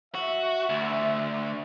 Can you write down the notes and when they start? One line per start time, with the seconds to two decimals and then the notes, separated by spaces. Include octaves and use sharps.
0.15 F#4 E5
0.70 D2